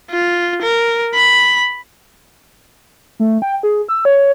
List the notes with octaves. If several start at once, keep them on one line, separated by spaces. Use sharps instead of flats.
F4
A#4
B5
A3
G5
G#4
E6
C#5